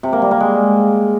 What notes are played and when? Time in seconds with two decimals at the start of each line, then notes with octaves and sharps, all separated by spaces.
0.03 C3
0.13 A#3
0.22 G3
0.31 A#3
0.40 G#3